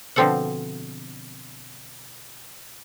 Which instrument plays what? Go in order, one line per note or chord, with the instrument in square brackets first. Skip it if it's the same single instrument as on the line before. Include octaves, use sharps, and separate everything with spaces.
[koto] B2 D3 F3 C4 A4 F#5